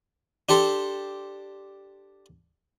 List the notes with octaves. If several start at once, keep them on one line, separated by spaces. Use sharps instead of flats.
D4 G4 A4 C5